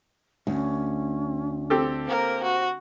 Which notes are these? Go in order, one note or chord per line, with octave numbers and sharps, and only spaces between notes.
D2 C#4
C4 G4 A4
A#3 A#4 C5
F#4